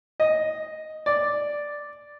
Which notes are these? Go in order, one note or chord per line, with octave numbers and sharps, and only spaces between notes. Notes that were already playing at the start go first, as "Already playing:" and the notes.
D#5
D5